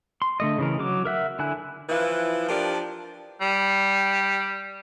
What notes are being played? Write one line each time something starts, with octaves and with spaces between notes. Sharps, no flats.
C6
D3 A3 D#5
C#3 E3 A#4
F#3 D6
A#4 E5 F#5
D3 E4 G#5 F#6
E3 F3 E4 B4
F3 D4 G4 A#4
G3